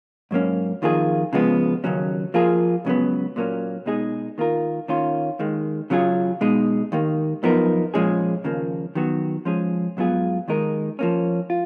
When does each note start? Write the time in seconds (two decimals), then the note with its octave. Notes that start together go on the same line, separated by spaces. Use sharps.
0.31 G#2 F#3 A#3 C#4
0.82 F2 D#3 A#3 F4 G#4
1.33 C#3 F3 G#3 B3
1.84 D#2 C#3 F#3 C#4
2.34 F3 A#3 F4 G#4
2.85 C#2 C#3 F#3 B3
3.36 A#2 F#3 A#3 C#4
3.86 B2 G#3 D#4 G#4
4.38 D#3 A#3 F4 A#4
4.88 D#3 A#3 C#4 F4
5.39 D#2 D#3 G#3
5.90 C#3 F#3 C#4 F4 G#4
6.41 B2 G#3 D#4
6.92 D#2 D#3 A#3
7.43 F#2 F3 B3 D#4 A#4
7.94 A#2 F3 G#3 C#4 G#4
8.44 D#2 C#3 F3 A#3
8.95 D#3 F#3 B3 F#4
9.45 F3 G#3 C#4 G#4
9.97 G#2 F#3 B3 F4 G#4
10.48 D#2 D#3 G#3 D#4 A#4
10.99 F3 A#3 C#4
11.50 F4